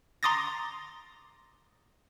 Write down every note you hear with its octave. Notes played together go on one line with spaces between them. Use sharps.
A#5 C6 D6 D#6 A6 A#6